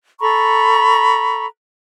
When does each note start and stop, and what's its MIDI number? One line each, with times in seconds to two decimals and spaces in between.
0.20 1.45 69
0.20 1.45 82
0.20 1.45 83
0.20 1.45 85